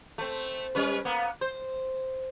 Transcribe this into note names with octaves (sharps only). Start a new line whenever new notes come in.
A3 C4
G3 C#4 B4
A#3 B3
C5